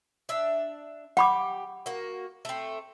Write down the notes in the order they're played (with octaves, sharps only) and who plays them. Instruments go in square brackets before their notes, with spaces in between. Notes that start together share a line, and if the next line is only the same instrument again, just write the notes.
[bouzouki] D4 E5
[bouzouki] G4 [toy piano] F#5 B5 D6
[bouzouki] A#3 F#4
A3 C4